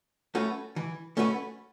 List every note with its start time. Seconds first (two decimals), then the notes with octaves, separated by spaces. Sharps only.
0.35 A3 C#4 F#4 B4
0.76 E3
1.17 A3 C#4 F#4 B4